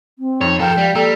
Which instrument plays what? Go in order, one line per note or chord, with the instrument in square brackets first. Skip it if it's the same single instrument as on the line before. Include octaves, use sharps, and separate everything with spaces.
[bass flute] C4
[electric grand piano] F2 D#4 [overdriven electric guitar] C#5
[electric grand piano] F3 [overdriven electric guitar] A4 A#4 [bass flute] F5 [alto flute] G5
[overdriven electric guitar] G3
[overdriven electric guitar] G3 [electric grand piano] A#3 A#5 E6 [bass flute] A4